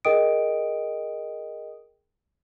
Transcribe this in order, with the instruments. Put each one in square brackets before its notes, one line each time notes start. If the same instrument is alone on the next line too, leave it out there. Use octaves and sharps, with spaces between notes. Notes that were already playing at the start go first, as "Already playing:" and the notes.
[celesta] G#4 A#4 D#5 G5 D#6 D7